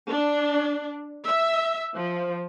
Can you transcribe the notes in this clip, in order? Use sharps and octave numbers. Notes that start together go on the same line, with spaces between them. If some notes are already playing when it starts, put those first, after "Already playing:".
D4
E5
F3